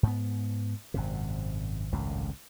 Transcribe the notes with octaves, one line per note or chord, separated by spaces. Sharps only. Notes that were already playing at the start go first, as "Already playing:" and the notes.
G#2 B3
G#1 F#2 C3
G#1 C#2 F#2 A2